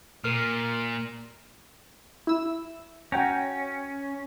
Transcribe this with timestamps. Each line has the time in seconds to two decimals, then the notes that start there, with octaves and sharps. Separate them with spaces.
0.24 A#2 A#4 F6
2.27 E4 E6
3.12 C#4 F#4 G5 A#5